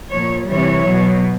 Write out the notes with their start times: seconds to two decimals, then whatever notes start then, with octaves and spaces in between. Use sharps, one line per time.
0.11 A#2 F3 C#5
0.48 C3 E3 G3 C#5
0.84 B2 F#3